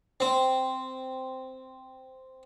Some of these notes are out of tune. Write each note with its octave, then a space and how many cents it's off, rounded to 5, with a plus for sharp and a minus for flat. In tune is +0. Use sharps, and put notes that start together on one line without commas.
C4 -5